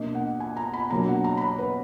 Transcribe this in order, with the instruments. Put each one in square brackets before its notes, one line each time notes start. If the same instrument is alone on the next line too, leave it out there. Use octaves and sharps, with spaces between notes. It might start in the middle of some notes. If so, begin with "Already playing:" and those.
Already playing: [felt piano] B2 A#3 D4 D#5
F#5
G#5
A#5
B5
B2 F#3 A#3 D4 A#5
F#5
A#5
B5
A#5
B4